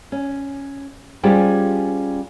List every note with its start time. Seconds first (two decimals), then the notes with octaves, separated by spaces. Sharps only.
0.12 C#4
1.23 G3 C#4 F4 G4 G#4 C5